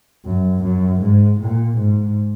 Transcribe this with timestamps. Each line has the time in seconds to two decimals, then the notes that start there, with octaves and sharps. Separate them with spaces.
0.26 F#2
0.64 F#2
1.02 G#2
1.40 A#2
1.78 G#2